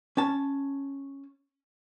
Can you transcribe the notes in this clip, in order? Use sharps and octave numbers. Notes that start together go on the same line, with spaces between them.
C#4 A5